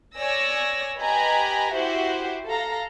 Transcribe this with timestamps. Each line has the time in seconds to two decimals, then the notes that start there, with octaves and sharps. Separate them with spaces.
0.15 C#5 D5 G#5 E6 A#6
1.00 G4 B4 D#5 G#5 A#5 B5
1.74 E4 F#4 G4 C5 E5 F#5
2.46 A4 F5 A#5